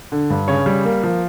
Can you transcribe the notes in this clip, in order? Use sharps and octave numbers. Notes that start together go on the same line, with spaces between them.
D3
G2
C#3 C#5
G3
A#3
F3